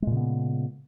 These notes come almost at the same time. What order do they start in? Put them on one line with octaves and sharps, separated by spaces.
G#3 A#2 C#3 B3